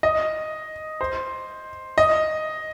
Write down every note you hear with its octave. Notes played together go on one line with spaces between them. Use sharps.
D#5
C5
D#5